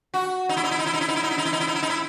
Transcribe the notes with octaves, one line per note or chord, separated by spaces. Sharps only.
F#4
D#4
E4
D#4
E4
D#4
E4
D#4
E4
D#4
E4
D#4
E4
D#4
E4
D#4
E4
D#4
E4
D#4
E4